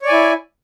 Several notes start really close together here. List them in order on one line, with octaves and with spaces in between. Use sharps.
C#5 D5 G#5 E4